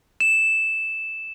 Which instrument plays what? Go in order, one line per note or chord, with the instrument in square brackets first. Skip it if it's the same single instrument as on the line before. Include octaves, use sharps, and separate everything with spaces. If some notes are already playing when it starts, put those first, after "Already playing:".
[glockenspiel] E7